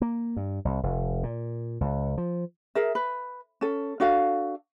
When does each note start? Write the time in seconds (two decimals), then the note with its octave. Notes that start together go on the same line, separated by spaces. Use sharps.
0.02 A#3
0.37 G2
0.65 C2
0.83 F1
1.23 A#2
1.81 C#2
2.18 F3
2.75 G#4 A#4 E5
2.95 B4
3.61 C#4 A4
4.00 D4 F#4 A4 F5